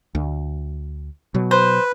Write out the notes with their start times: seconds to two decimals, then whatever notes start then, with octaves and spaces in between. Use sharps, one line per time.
0.15 D2
1.34 B2 F#3
1.51 B4 C5